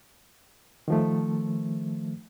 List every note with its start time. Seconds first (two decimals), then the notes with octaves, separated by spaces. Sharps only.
0.88 D#3 F3 A3